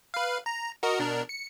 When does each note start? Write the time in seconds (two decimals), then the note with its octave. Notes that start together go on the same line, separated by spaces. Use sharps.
0.14 B4 F5
0.46 A#5
0.83 F#4 A#4 D#5
0.99 B2 D4 A#4
1.29 C#7